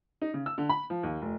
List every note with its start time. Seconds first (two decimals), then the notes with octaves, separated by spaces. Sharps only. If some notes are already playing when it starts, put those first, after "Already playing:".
0.22 D#4
0.34 C#3
0.46 E6
0.58 D3
0.69 B5
0.90 F3
1.03 D#2
1.22 F1